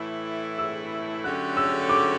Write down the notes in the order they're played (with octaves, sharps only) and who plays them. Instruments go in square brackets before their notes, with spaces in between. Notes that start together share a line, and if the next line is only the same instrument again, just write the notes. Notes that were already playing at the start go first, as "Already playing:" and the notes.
Already playing: [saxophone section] A2 E3 A3 E4
[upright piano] E6
[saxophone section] D3 F#3 A3 C#4 G4 [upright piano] F#6
[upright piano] E6
D6